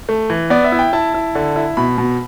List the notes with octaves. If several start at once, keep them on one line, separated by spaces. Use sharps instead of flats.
A3
E3
B3 D5
E5
E4
G5
E4 A5
E4
D3
E4
B2 B5
B2